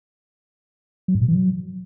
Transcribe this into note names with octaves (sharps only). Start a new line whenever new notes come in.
F#3
G#2
B2
E3
F#3